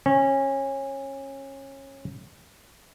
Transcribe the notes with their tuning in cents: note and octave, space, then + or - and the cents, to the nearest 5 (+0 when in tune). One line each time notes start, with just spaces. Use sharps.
C#4 -25